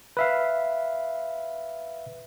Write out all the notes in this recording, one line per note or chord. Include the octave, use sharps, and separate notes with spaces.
B4 E5 F5